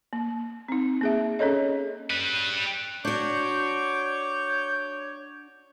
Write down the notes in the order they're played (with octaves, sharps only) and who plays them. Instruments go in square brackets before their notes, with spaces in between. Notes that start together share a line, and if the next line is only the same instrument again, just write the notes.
[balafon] A#3
C4 D#4
A#3 G#4 E5
C#4 G#4 A4 C#5 D#5
[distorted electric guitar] G3 B4
[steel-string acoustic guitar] D4 F#4 [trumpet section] C#5 [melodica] C#6 D6 [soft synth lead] G6